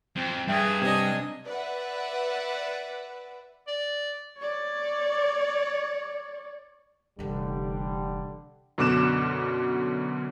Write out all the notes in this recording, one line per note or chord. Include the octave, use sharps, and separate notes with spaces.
F2 C4
G2 G#4 E5 G5
C3 D4 D#5 G#5
B4 D5 E5 F#5
D5
C#5 D5
F1 D3 E3 G3
F#2 B2 D3 D6 F#6 E7